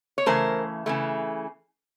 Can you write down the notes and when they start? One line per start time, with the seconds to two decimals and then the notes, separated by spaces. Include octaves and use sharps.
0.18 C#5
0.26 C#3 E3 A3 A#4 C5
0.86 C#3 E3 A3